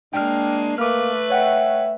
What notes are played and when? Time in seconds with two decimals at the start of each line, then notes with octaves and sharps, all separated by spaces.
0.14 G#3 A#3 D4 G5 F6
0.78 A3 A#3 B4 D6 F6
1.30 C#5 E5 F#5 G5